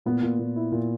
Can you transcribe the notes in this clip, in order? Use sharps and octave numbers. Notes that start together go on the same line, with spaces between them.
A#2 B3
A#2
A#2
E4
A#2